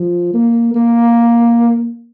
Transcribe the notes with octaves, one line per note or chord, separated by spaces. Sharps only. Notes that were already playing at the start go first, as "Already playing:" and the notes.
Already playing: F3
A#3
A#3